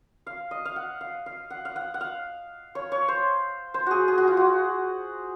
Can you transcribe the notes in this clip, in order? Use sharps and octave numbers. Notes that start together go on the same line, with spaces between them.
F5
D#5
F5
F#5
F5
F5
F#5
F5
F#5
F#5
F5
C#5
C#5
C5
C5
F#4 G#4
G#4
F#4
F4
F#4